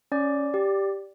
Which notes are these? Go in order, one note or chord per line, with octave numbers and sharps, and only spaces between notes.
C#4 D5
G4